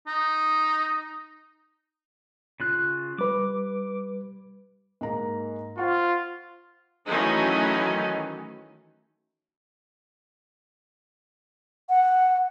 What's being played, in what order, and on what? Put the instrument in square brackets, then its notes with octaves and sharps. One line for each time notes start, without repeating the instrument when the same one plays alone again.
[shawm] D#4
[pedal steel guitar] C#3 F4 F#6
[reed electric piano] G3 B4 [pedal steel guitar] D6
[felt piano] G#2 A#3 A#5
[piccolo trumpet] F4 [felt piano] C5 F#5 C#6
[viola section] D#3 E3 F#3 A3 C#4 D#4
[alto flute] F#5